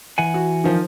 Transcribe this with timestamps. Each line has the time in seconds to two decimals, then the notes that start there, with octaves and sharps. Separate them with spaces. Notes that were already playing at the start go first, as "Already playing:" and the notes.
0.18 E3 F#5 G#5
0.34 F#4
0.64 D#3 F3